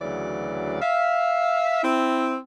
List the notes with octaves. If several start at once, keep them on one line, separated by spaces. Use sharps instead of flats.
D2 C#3 E3 F#3 D5
E5 F5
C4 E4